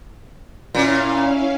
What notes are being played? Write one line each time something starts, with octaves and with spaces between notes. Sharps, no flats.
A#2 C#4 E4 F5